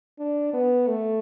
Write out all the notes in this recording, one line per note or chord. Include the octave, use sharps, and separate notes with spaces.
D4
B3
A3